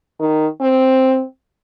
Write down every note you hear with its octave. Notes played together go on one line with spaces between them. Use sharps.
D#3
C4